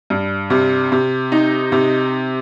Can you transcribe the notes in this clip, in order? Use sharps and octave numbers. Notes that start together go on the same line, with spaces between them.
G2
C3
C3
D#4
C3